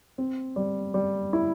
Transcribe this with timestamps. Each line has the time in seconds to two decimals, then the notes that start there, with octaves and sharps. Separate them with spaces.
0.18 C4
0.56 G3
0.94 G3
1.33 E4